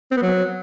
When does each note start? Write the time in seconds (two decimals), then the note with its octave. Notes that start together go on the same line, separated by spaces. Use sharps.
0.11 C4
0.17 B3
0.22 F#3